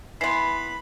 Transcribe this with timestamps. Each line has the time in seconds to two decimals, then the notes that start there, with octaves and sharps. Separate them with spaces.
0.21 E3 B3 B5 C6 C7